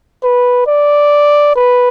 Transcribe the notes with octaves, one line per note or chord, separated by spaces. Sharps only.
B4
D5
B4